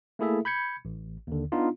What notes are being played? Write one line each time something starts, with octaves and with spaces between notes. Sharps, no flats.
A3 A#3 E4 G#4 A4 E5
B5 G6 G#6 C#7
A1
D#2 D3
B3 D4 D#4 F4